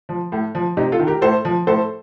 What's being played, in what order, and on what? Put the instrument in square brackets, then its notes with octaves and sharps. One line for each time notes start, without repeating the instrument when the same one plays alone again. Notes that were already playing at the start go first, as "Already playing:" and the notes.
[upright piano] F3
A2
F3
C3 D#4 G4
F4 A4
D#3
G4 A#4
A2 A4 C5
F3
A2 A4 C5